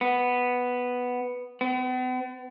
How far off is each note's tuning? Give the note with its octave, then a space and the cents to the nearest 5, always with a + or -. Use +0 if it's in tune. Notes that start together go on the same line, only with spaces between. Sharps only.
B3 +0
B3 +45